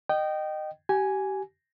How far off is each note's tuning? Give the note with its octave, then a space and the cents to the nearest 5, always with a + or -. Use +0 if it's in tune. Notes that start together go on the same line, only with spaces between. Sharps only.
D#5 -20 G5 -20
G4 -30 G#5 +0